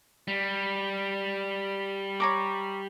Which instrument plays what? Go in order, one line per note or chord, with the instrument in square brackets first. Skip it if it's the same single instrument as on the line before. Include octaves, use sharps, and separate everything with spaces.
[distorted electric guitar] G3
[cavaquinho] C#5 A#5 D6